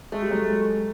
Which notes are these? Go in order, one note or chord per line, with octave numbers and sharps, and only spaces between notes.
G#3 A3
G3
F#3 G#3